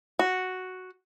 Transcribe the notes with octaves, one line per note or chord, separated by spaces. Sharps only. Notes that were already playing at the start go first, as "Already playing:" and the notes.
F#4